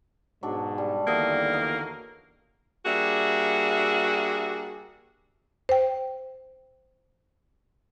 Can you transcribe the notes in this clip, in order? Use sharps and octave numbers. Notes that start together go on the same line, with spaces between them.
G#2 B2 F#3 G#3 D4
G3 A5
E2 D3 D#3 A#3 D#5 E5 F#5
A#4 D#5
G3 A#3 D4 F#4 G#4 E5
C5 G5